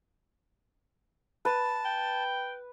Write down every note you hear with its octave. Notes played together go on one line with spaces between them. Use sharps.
B4 A5
G5